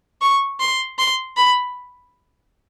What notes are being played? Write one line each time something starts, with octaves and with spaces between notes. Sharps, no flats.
C#6
C6
C6
B5